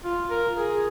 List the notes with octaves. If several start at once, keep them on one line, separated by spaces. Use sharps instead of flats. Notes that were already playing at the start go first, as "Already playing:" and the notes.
F4
A#4
G#4